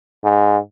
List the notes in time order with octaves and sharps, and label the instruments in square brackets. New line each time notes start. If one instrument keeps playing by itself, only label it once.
[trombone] G#2